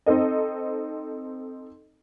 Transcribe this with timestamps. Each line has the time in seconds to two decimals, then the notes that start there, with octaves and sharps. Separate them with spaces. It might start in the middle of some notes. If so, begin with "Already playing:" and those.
0.06 C4 D#4 A4 D#5